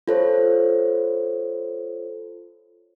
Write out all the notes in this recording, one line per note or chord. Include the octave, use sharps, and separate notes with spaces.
F4 A4 C5 C#5